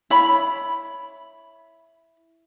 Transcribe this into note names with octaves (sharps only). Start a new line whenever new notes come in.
E4 C#5 B5